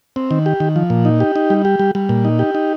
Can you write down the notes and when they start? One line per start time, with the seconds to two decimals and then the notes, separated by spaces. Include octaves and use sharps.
0.16 C4
0.31 D#3
0.46 G4
0.60 D#3
0.76 F3
0.90 A#2
1.05 D#4
1.20 G4
1.36 D#4
1.50 G3
1.65 G4
1.79 G3
1.95 G3
2.09 A#2
2.25 D#4
2.39 G4
2.55 D#4